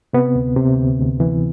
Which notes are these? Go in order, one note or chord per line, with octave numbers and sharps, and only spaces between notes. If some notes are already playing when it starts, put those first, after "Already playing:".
C3 B3
D2
C3
D2
D2
E3